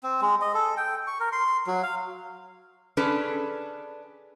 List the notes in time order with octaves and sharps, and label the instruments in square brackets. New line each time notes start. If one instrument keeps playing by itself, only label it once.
[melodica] C4
G#3
D#5
A4
G5
C#6
A#4
C6
F#3
F5
[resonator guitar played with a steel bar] C#4 D4 G#4 A4 B4